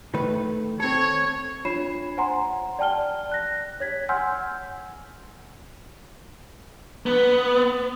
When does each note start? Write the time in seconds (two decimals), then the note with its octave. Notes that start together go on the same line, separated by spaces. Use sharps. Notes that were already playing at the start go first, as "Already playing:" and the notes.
0.14 D#3 A3 B4
0.80 C4 A4 C#5
1.65 D4 F4 C#5 B5 C7 E7
2.17 C5 F#5 G#5 A#5 C6
2.79 D5 G5 A5 F6 G7
3.32 F#6 A#6
3.80 C#5 G#6 B6
4.09 F#5 G#5 C6 E6 F6 G6
7.06 B3